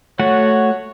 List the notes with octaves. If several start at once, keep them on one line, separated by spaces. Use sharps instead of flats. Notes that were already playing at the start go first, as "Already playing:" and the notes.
A3 F#4 C#5 F#5